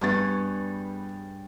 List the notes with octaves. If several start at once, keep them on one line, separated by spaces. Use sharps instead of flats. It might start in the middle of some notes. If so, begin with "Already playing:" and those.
G2 G3 B3 G#4 C#5 A6